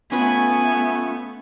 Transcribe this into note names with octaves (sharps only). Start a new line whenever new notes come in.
A3 B3 C#4 F4 B4 G#5